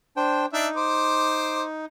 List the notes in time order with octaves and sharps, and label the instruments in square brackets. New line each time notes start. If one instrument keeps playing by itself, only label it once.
[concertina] D4 C5 G5
[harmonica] D4 E5 [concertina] D#4
[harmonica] C5 D6